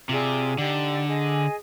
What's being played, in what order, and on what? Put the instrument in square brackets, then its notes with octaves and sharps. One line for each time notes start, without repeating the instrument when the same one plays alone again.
[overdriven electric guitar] C3 [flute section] F4 G#4 D5
[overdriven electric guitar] D3 [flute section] D#4 G4 D5
[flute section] G#4 D#5 G#5